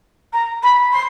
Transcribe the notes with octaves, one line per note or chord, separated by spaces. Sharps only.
A#5
B5
C6